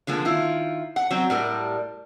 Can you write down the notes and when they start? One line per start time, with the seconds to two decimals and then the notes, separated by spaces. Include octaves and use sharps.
0.07 D3 F3 G#3 A#3
0.25 D#3 E4 F4
0.96 F#5
1.11 F#3 C4
1.30 A2 G3 A#4